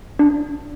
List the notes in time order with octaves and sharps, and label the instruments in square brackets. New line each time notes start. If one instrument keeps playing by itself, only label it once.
[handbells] D4